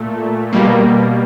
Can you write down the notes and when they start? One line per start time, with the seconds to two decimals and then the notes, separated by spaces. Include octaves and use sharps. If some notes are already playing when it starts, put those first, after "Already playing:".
Already playing: A#2 A3
0.53 B2 G3 A#3